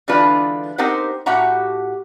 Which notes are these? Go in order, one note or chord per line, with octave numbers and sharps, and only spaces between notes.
D3 E3 G#3 D4 F4 B4
C4 D#4 G4 A#4 C5 F#5
A2 F#4 G4 E5 F#5 A#5